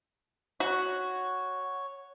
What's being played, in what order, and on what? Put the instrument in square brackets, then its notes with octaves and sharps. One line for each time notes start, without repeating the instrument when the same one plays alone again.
[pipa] F#4 [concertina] C#5